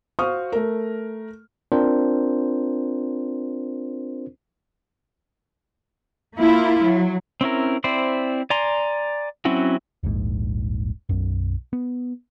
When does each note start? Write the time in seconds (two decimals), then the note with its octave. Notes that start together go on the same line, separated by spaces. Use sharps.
0.19 F#4 C5 F5 C#6 D#6 F6
0.52 A3 A#4
1.72 C4 D4 F4 A#4 C5
6.37 A#3 E4 F4
6.85 F#3
7.41 C4 C#4 E4 A#4
7.84 C4 E4 C5 D5
8.50 D5 G#5 A#5 C6
9.45 F#3 C4 C#4 E4 F#4
10.03 D#1 A#1 G#2
11.09 B1 F#2
11.73 B3